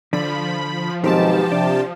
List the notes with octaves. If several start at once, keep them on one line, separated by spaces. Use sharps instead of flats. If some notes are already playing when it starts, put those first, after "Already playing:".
D3 F3 B5
B1 G#2 B2 D#3 C4 G4 A5
C3 D4